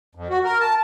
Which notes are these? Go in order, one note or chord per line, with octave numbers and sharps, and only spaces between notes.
F2
F#4
A#4
A5